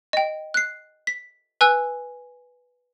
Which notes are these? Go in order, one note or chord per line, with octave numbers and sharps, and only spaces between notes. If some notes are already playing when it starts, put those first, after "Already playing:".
D#5 G5
F#6 C7
B6
B4 G#5 E6 F#6